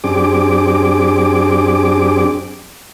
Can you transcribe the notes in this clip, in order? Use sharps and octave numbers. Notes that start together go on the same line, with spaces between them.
F#2 C4 D4 G4 G#4 D6